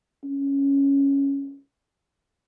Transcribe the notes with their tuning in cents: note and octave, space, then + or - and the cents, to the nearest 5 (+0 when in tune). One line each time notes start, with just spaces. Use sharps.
C#4 +0